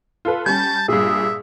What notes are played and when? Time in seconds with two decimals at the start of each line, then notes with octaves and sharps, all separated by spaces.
0.25 F4 A4 B4
0.46 G3 C#4 A5 G6
0.88 G2 A#2 G#4 E5